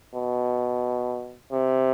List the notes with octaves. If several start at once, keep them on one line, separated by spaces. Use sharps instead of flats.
B2
C3